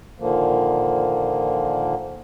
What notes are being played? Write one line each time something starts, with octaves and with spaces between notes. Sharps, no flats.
A#2 D3 D#3 F3 A#3